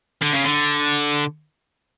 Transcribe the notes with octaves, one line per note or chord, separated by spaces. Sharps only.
D3
C#3
D3